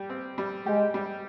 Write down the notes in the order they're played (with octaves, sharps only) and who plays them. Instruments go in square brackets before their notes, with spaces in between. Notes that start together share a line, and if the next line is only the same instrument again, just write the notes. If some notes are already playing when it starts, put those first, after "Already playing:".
Already playing: [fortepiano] G3 G4
C4
G3
[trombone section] G#3 [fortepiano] G4
[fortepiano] G3